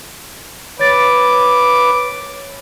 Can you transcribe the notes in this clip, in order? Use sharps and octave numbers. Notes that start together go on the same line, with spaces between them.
B4 C#5 D6 A6 D7